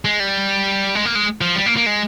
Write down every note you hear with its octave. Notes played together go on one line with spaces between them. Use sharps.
G#3
G3
G#3
A#3
G#3
F3
G3
A#3
A#3
G#3